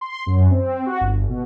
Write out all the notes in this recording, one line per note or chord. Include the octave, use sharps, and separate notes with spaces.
C6
F#2
C4
F#4
G1
B2